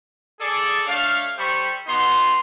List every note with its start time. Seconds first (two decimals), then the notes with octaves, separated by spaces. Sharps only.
0.40 G#4 A4 D5
0.87 A3 D4 C#5 F5
1.38 G3 G4 A4 C5 B5 C#6
1.87 B3 D#4 F#4 A#5 C6